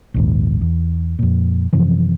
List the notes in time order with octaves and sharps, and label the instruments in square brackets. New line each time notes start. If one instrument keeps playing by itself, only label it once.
[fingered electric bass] A#1 D#2 G#2
E2
F2 A#2
F#2 C3 E3 F3